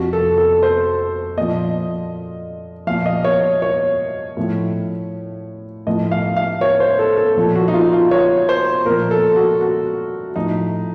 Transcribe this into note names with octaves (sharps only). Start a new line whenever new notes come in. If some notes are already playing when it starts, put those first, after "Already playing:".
Already playing: F2 C3 F3 F#4
A4
A4
C5
A#2 F3 D#5
A#2 F3 F5
D#5
C#5
C#5
A2 F3
A2 F3 D#5
F5
F5
C#5
C5
A4
A4
A#2 F3
F#4
D#4
F4
F4
C#5
C5
A#2 F3 A#4
A4
F#4
F#4
A2 F3 D#4